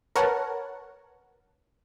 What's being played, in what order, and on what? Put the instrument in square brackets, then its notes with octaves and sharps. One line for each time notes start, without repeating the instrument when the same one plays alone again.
[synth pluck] A#4 B4 C#5 F#5 A5